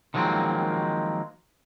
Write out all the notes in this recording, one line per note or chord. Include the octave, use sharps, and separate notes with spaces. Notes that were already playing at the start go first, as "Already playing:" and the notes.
D#3 F3 F#3 G#3 A#3 C4